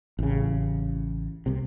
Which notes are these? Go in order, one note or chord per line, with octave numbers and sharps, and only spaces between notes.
A1 C#3
C2 C3